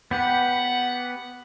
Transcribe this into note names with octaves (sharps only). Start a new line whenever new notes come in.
B3 G4 B4 F#5